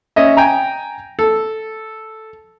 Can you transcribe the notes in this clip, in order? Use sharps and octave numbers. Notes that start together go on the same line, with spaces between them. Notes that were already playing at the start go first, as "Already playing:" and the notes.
C#4 D#5 E5
G5 G#5 A#5
A4